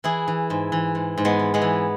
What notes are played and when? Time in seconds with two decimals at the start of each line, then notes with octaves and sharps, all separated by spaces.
0.04 E3 E4 G#4
0.28 E3
0.50 G#2
0.72 E3
0.95 G#2
1.18 G#2
1.25 G#3 B3
1.39 E3
1.54 G#3 B3
1.62 E3